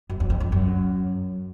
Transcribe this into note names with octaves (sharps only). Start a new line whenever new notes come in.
F#2
E2
F2
F2
F#2